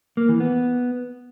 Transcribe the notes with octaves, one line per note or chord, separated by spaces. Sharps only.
A#3
E3
B3